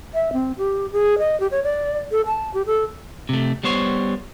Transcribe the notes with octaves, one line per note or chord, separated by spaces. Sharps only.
E5
C4
G4
G#4
D#5
G4
C#5
D5
A4
A5
G4
A4
C3 A3
G3 B3 C5 C#5